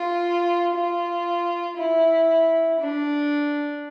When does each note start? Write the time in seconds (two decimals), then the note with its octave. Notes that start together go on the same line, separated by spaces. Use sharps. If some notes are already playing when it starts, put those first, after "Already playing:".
Already playing: F4
0.75 F4
1.78 E4
2.81 D4